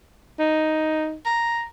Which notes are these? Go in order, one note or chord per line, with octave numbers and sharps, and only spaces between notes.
D#4
A#5